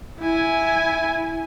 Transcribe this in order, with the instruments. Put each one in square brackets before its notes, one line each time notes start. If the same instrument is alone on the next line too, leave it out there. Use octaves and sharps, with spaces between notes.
[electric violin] E4 G#5